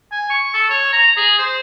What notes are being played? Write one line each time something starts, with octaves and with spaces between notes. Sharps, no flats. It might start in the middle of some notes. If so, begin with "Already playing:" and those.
G#5
C#6
A4
C#5
A#5
G#4
C5